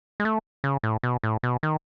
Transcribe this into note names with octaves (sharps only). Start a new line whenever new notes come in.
G#3
A3
C#3
A2
B2
A2
B2
D#3